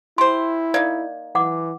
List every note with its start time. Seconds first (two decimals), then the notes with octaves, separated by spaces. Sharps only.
0.18 E4 G4 C5 C6
0.74 A#3 D#4 D5
1.35 E3 F#5 D6